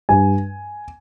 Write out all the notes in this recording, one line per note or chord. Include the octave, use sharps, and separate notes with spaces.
G2 G#5